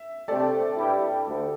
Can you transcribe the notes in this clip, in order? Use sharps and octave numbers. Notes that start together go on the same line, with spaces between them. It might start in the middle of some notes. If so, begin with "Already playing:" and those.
Already playing: E5
C3 A3 C4 G4 A4 C5 D5
G2 G3 E4 G4
D2